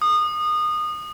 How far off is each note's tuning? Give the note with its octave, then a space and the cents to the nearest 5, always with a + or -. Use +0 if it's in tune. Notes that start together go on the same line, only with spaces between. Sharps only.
D#6 -25